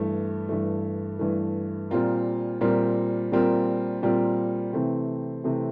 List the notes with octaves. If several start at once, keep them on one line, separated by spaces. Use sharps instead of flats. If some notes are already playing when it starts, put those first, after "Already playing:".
Already playing: G2 E3 A3
G2 E3 A3
G2 E3 A3
A#2 G3 C4 F4 A#4
A#2 G3 C4 F4 A#4
A#2 G3 C4 F4 A#4
A#2 G3 C4 F4 A#4
C3 E3 A3 C4
C3 E3 A3 C4